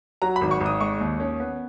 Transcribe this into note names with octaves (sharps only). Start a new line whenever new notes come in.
F#3 A#5
B5
G#1
C#6
G#1
D#6
G#3 C#6
D#2
C#4
B3